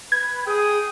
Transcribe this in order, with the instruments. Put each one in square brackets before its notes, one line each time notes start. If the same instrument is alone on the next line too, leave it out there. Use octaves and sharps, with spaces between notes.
[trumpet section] B4 [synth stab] G#6
[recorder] G#4 [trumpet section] G5 D#6